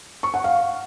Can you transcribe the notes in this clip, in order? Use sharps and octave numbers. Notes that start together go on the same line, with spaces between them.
C#6
F#5
F5